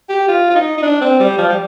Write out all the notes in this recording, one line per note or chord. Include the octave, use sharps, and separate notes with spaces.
G4
F4
F4
D#4
D#4
D4
C4
G3
F3
G3